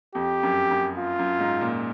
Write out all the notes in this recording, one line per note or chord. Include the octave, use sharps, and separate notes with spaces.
F2 G4
F#2
F#2
F4
F#2
G#2
A#2